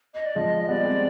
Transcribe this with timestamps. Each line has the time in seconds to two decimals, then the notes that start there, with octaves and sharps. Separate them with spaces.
0.14 D#5
0.25 D5
0.35 F3 G#3 D#5
0.63 D#5
0.69 G3 B3 D5
0.85 G#3 C4